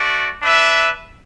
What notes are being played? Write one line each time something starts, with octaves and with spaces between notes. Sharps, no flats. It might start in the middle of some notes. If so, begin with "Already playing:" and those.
Already playing: A3 F#4 D5
D4 B4 E5